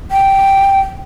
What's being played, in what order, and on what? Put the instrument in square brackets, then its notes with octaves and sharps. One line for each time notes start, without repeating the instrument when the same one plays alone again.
[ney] G5